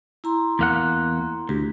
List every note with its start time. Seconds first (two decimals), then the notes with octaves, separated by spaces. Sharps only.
0.24 E4 A#5 C6
0.59 E2 A#3 F#5
1.49 D2 G4